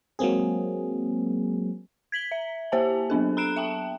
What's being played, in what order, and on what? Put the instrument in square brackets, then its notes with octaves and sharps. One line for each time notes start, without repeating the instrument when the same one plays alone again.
[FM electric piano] F#3 G#3 A#3 C4 G#4
[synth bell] G#6 B6 F#7 G7
E5
A#3 G4 C5 E5 G#5 A5
F#3 B3 D4 A4
A#5 B5 F#6 D7 E7
E5 G5 A5